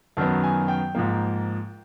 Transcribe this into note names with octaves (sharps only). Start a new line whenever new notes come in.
F#2 D#3 F#3 B3 A5
G#5
G5
G#2 F3 A#3